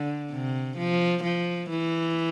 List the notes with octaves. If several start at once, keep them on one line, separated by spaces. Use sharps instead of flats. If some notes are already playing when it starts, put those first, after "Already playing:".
Already playing: D3
C3
F3
F3
E3